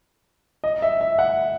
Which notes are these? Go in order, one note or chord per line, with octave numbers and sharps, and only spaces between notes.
D#5
E5
E5
F#5